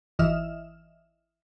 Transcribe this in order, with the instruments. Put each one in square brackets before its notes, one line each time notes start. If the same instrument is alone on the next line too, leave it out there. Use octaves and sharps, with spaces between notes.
[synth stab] G#1 E3 D#5 E5 F6 E7